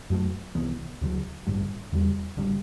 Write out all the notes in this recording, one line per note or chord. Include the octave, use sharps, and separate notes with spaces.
F#2 F#3 A3
C2 C3 E3 B3
D2 D3 F#3
A1 G2 D3
E2 D3 G3
A1 D3 G3